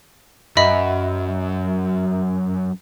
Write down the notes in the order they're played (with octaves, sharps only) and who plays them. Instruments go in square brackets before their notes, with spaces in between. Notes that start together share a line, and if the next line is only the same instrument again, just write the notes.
[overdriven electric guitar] F#2 [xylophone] D#5 E5 B5